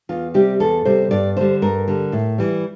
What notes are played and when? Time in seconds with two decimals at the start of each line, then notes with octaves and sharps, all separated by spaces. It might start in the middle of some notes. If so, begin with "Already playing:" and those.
0.09 E2 F4
0.34 C3 G3 G4
0.60 E2 A4
0.85 C3 G3 C5
1.11 G2 D5
1.37 D3 G3 C5
1.62 G2 A#4
1.87 D3 G3
2.12 A2
2.38 E3 G3